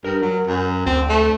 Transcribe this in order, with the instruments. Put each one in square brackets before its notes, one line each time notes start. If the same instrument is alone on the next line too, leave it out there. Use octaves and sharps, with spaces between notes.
[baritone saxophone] G2 [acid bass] A#4
[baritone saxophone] F#3
F#2
[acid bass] D2 [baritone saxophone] C4
[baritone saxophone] A3